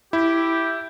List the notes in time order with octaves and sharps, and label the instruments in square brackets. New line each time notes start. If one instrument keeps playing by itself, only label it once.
[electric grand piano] E4 [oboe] G4